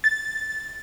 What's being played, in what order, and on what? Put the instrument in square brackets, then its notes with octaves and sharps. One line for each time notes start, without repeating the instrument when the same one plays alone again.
[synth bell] A6